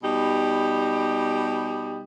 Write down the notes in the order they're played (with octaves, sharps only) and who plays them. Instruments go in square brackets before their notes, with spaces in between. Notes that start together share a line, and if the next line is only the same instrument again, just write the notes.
[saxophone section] B2 G3 D#4 G4